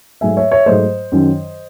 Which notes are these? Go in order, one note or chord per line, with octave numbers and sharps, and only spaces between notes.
G#2 F#3 A3 E5 G#5
C#5 E5
C#5 E5
G#2 F#3 A3 C5 D#5
F#2 D#3 F#3 C#4